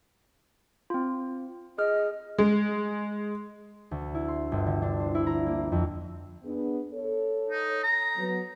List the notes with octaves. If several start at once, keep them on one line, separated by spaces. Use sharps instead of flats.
C4 F4
G#4 D#5 F6
G#3
D2
E4
C6
G1
D3
D4
C5
E4
A#5
A#3
F2
B3 D4 G#4
A4 C#5
D#4
A#5
F#3 B3